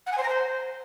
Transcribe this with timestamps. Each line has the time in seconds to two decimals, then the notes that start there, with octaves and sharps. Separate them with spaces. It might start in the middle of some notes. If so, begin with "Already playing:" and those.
0.06 F#5
0.11 G#5
0.17 C5
0.22 A#5
0.28 C5